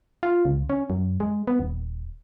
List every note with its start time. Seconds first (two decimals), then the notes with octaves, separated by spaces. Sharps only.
0.23 F4
0.45 C#2
0.70 C#4
0.90 F#2
1.20 G#3
1.47 B3
1.59 D#1